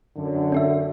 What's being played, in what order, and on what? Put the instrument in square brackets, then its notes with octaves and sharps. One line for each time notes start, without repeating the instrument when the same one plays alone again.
[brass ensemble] F#2 D3
[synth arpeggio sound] C#4 F#4 E5